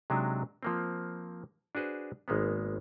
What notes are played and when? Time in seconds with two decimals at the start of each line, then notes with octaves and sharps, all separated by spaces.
0.10 C3 F#3 G#3 D4 D#4
0.63 F3 A#3 C4
1.75 D4 F#4 G#4 B4 C5
2.28 G#1 G#3 A#3 B3